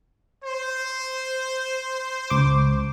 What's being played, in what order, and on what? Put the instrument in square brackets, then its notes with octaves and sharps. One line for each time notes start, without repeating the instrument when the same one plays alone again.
[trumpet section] C5
[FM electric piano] C#2 D6